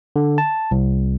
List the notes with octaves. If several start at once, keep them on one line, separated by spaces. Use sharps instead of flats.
D3
A5
C2